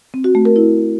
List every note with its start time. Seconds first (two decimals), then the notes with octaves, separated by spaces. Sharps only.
0.14 C4
0.24 F#4
0.35 A3
0.45 A#4
0.56 E4